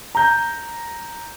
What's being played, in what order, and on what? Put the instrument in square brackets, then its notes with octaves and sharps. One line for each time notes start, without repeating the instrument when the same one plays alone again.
[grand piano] A#5 G6